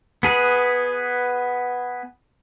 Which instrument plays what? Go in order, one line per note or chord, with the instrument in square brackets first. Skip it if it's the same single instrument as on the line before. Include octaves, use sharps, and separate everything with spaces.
[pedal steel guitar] B3 G#4 B4